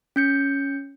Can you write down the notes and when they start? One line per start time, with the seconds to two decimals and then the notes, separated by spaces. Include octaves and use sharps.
0.16 C#4 G6 C#7